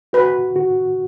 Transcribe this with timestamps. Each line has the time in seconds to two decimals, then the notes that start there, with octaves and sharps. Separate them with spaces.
0.13 F#4 B4
0.56 F#4